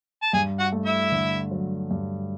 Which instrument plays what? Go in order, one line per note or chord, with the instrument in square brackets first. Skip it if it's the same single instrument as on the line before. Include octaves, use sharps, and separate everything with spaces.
[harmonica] A5
[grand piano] G2 [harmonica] G#4 G#5
[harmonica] F#4 F#5
[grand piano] A3
[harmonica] E4 E5
[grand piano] D3
F#3
G2